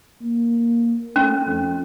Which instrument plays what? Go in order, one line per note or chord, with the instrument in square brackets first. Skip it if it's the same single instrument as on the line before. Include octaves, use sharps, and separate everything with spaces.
[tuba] A#3
[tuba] A3 [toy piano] C#4
[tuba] F2